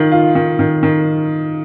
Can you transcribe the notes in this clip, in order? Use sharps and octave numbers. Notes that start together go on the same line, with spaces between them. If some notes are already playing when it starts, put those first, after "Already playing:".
Already playing: D#3 F4
F4
D#3
D#3
D#3